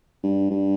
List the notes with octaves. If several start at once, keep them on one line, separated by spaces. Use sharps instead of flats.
G2
G2